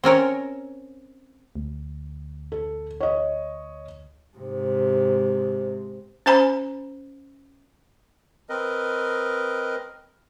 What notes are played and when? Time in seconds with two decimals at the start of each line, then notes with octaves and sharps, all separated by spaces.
0.04 C4 C#4 A#4 C#5
1.55 D2
2.52 A4
3.00 C#5 D#5
4.37 G#2 C3
6.26 C#4 C5 G#5 A#5 B5
8.49 C4 A#4 B4 D#5